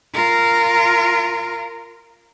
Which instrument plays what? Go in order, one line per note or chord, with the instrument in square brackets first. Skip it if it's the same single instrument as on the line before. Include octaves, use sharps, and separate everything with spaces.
[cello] F4 A#4